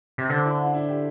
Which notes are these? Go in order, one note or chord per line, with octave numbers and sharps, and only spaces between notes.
C3
D3 C5
E4
D4
E4
G4